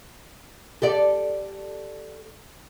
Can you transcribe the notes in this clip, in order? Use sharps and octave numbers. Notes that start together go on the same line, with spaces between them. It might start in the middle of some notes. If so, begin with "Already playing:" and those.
G4 A4 D5